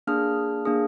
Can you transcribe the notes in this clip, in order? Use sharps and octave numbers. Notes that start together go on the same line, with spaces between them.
A#3 D4 G#4 F6
A#3 D4 G#4